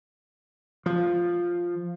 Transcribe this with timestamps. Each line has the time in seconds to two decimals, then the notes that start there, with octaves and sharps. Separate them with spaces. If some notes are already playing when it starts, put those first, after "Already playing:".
0.86 F3